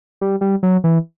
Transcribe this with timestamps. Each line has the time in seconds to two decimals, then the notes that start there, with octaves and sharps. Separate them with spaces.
0.21 G3
0.41 G3
0.63 F#3
0.84 E3